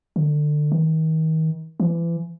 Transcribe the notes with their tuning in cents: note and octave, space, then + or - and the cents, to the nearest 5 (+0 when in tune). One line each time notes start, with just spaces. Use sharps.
D3 +25
D#3 +35
E3 +35